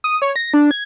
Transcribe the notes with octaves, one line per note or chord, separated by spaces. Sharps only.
D#6
C#5
A#6
D4
G#6